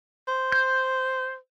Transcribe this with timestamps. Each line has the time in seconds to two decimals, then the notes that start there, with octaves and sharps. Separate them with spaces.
0.28 C5
0.52 G6